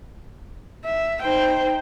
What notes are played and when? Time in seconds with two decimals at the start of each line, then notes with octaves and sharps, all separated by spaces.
0.85 E5
1.22 D#4 C5 G5